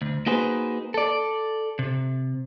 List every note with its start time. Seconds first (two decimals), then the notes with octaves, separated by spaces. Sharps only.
0.02 D2
0.26 A#3 D#4 F#4 G#4 B4 C5
0.94 A4 D5
1.79 C3